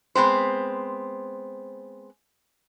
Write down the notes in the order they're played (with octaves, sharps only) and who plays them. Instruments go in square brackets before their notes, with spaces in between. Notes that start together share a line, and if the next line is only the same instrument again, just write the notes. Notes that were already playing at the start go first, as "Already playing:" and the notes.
[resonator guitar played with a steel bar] G#3 B3 C4 C5